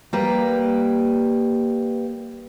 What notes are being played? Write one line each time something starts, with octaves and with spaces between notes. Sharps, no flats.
G3 A#3 B4